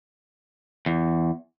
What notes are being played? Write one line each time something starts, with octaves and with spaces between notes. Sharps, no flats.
E2